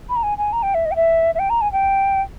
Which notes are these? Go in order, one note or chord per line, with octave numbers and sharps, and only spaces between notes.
B5
A#5
G#5
G#5
A#5
G5
E5
D#5
G5
E5
E5
G5
A#5
G#5
G5